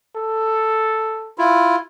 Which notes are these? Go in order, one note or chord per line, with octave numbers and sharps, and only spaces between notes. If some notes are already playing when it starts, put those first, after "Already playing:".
A4
E4 F4